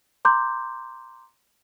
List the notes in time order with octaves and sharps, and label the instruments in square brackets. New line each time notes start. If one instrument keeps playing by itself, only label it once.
[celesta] A#5 C6 D6 G6